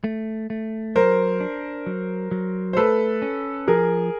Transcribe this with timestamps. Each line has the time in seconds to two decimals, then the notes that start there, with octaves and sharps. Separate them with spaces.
0.04 A3
0.50 A3
0.96 F#3 A#4 C5
1.40 D4
1.86 F#3
2.31 F#3
2.73 C5
2.77 A3 A4 B4
3.22 C#4
3.68 F3 G#4 A#4